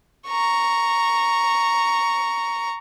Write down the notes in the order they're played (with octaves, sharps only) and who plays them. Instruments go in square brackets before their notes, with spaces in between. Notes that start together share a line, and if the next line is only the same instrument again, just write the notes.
[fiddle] A#5 C#6